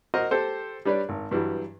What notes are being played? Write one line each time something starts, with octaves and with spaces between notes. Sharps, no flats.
F#4 A#4 C5 D#5
G4 A4 C5
G3 D4 B4 C#5 D5
G#1
G2 E3 F#3 G3